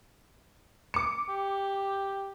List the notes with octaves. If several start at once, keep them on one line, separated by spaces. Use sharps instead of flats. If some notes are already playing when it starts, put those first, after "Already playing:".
D6 C#7
G4